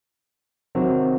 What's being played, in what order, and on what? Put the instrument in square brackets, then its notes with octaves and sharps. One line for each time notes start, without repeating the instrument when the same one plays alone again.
[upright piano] C3 D#3 F#3 C4